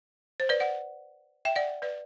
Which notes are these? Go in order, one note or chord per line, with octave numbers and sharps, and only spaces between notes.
C5
B4 D5
D5 F#5
E5 G5
D5 F#5
B4 D5